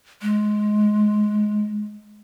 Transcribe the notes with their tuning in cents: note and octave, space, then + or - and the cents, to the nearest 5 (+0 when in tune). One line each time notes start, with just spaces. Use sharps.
G#3 +15